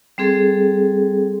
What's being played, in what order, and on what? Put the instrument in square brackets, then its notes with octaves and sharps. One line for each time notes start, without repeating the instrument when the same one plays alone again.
[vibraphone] G3 C4 G#4 A4